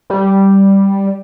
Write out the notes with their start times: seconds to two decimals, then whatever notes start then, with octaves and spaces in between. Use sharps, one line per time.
0.10 G3